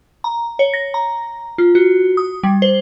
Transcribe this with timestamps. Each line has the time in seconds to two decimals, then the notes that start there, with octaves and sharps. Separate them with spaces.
0.24 A#5
0.59 C#5
0.74 A#6
0.94 A#5
1.58 F4
1.75 F#4
2.17 D#6
2.43 G3
2.62 C5